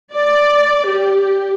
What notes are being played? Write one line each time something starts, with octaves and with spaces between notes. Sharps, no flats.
D5
G4